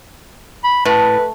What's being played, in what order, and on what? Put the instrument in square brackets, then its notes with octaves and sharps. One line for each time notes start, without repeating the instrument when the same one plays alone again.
[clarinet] B5
[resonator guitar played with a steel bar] A2 [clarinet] B4